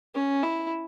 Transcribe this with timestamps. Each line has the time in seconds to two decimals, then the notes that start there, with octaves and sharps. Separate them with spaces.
0.15 C#4
0.43 E4